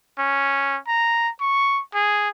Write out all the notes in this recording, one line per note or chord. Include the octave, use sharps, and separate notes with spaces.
C#4
A#5
C#6
G#4